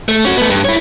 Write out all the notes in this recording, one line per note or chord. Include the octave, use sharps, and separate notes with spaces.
A3
C#4 F#4
A3 B3
G2
E4 C#5